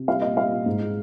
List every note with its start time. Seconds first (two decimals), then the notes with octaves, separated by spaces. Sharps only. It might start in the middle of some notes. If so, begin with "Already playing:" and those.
Already playing: C3
0.08 G3 F5
0.22 A#2 D#5
0.37 G3 F5
0.51 A#2
0.66 G#2
0.80 G#3